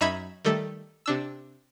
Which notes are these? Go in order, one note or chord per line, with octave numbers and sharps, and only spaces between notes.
F#2 D#4 E5 B5 G#6
D#3 G3 A3 A4
C3 D4 E6